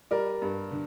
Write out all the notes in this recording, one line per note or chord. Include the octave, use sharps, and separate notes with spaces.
G3 A#4 D5
G2
D3